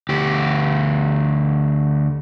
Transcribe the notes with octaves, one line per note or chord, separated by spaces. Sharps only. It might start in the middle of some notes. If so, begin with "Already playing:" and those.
D2 G4